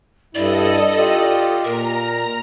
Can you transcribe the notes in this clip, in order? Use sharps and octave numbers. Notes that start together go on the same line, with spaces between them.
G2 E4 A4 D5 D#5
F4 G4
A#2 A#4 A#5